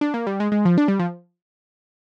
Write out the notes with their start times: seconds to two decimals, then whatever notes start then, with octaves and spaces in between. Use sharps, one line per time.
0.01 D4
0.14 A#3
0.27 G3
0.40 G#3
0.52 G#3
0.65 F3
0.78 D4
0.88 G3
0.99 F3